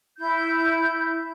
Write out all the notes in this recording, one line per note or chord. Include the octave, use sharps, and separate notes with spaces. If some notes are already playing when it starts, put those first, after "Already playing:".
E4 G6